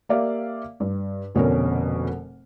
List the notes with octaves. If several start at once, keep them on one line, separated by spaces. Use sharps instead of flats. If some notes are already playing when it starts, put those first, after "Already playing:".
A#3 G4 D5 E5 F5
G2
F1 B2 D3 C#4 A4 A#4